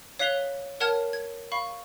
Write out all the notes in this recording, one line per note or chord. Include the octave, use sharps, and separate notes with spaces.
C#5 F5 F#6 B6 F7 G7
A#4 C#5 F#5 A5 F6 G#6
G#6
F5 B5 C#6